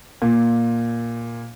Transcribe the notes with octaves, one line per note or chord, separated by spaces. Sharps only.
A#2